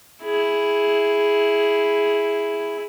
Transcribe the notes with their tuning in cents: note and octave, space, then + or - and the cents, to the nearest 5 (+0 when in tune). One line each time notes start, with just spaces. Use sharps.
E4 +0 G#4 +0